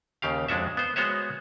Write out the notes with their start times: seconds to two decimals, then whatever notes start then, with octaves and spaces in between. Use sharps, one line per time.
0.22 D#2 C#3 G4 F5
0.48 F2 G#3 D4 F#4 E5
0.77 B3 C5
0.96 G#3 B3 F#4 C5 C#5 E5